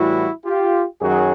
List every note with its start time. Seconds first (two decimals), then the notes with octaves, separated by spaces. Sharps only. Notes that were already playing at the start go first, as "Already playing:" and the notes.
Already playing: A2 E3 G3 E4 F#4
0.45 F4 G4
1.01 F#2 D#3 F#3 F#4 G#4